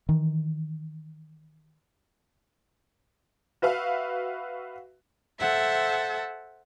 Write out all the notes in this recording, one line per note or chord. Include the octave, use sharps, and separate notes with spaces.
D#3 E3
F#4 B4 E5 F5
A4 C5 E5 F#5